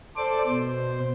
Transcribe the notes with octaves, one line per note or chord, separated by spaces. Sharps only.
A4 C5 D5 D6
B2 C5